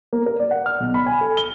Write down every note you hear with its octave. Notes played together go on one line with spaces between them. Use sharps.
A#3
A#4
D5
F#5
F6
B1
B5
G#5
A4
G7